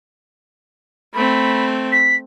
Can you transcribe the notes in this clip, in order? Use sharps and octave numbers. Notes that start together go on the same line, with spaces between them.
A3 C4 B5
B6